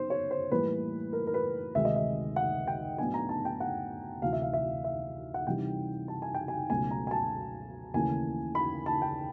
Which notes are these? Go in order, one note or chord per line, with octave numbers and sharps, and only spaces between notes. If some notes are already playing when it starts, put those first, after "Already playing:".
Already playing: C#3 F#3 B3 D#4 C5
C#5
C5
A2 E3 G3 A#3 B4
A#4
A#4
B4
D2 C3 D#3 G#3 E5
D#5
E5
F#5
G5
A2 F#3 B3 D4 G#5
A#5
A5
G5
F#5
D2 C3 E3 F5
E5
F5
E5
E5
F#5
C3 E3 G3 C4 D#4 G5
A5
G#5
G5
G#5
C#2 B2 F#3 A3 C#4 G#5
A#5
G#5
A5
D#2 C#3 E3 A3 C#4 G#5
B5
A5
G5